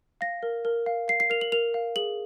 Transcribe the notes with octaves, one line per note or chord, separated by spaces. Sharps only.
F5 A#6
A#4
A#4
F5
F5 C7
C7
A#4 F7
F#7
A#4 F7
F5
G#4 F#7